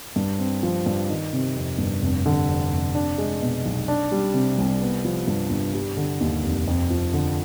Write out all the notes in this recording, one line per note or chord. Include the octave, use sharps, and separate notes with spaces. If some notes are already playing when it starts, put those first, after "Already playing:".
G2
C4
F3
G2
D#3
C3
F2
G1
F1
D3
F2
F1
D4
G#3
B2
B1
D4
G3
C3
C2
B3
F3
G2
G1
G3
D3
D#2
F1
F2
F3
D3